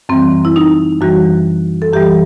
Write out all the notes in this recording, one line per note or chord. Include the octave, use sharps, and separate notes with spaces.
F#2 E3 G3 C4
E4
D#4
F#2 E3 G3 F#4
A4
F#2 E3 G3 G4